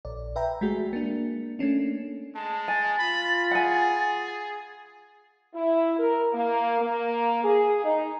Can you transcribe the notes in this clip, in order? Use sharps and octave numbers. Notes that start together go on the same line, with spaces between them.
A#1 D5
B4 E5 G5 A#5
G#3 A3 F#4 G#4
A#3 D4
A3 A#3 C#4 D4
G#3 A5
G#5 A6
F4 B5
G#4 F#5 G#5
E4
A#4
A#3
A#3
G#4
D#4